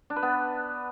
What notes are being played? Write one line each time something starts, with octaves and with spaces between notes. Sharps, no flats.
D4
B4
B3